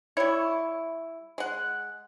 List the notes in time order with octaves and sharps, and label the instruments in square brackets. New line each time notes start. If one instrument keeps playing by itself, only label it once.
[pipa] G3 E4 [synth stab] C#5
[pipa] G#3 F#5